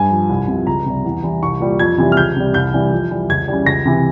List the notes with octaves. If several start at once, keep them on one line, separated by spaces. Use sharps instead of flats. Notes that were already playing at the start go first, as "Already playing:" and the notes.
Already playing: G2 G#5
F3
C2
C3 F3
C#2 A#5
C3 G3
E2
E3 G3
C2 C#6
A#2 G3
F2 G#6
C3 E3 G3
F6
C#2 G6
C3 G3
C2 G6
C3 E3 G3
F2
E3 G3
C#2 G#6
C#3 E3 G3
C#2 A#6
C3 E3